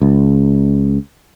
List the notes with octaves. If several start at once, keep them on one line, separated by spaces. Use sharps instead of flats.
C#2